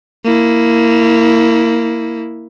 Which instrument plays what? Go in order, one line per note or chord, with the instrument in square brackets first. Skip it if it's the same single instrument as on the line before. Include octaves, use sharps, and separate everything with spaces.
[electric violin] A#3 E4